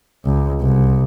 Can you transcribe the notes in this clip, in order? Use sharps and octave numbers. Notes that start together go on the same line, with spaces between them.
C#2
C2